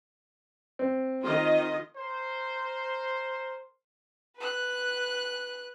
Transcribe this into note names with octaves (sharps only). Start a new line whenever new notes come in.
C4
D#3 F4 D#5
A#4 C5
B4 F#6